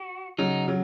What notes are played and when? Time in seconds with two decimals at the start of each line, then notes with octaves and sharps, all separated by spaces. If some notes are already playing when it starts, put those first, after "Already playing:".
Already playing: F#4
0.38 C#3 F#3 D#4
0.68 C#3 F#3